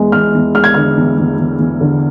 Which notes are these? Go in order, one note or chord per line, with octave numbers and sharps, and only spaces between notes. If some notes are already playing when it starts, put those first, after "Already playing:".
Already playing: E2 G#3
E2 F6
E2
G#3 F6
G#6
D3 F6
E2
E2
E2
E2
D3